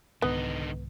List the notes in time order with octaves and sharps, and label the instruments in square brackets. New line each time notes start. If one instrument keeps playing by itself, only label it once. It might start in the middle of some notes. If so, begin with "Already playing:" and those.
[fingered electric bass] C2 G#2 D#3 [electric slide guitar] D3 D#4 [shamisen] B3